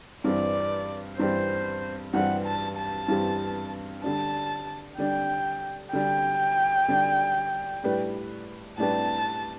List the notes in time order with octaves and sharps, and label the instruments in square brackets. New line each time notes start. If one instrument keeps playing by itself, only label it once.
[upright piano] G2 E3 G3 C4 G4 [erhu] D5
[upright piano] G2 E3 G3 C4 G4 [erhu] C5
[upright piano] G2 E3 G3 C4 G4 [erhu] F#5
[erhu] A5
A5
[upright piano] G2 E3 G3 C4 G4
[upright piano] D3 G3 D4 [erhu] A5
[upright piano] D3 G3 D4 [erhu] G5
[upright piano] D3 G3 D4 [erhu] G5
[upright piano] D3 G3 D4
A2 G3 D4 G4 B4
[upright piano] A2 G3 D4 G4 B4 [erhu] A5